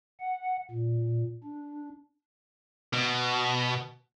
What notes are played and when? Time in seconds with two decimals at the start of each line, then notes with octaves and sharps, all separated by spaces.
0.20 F#5
0.71 A#2
1.44 D4
2.93 B2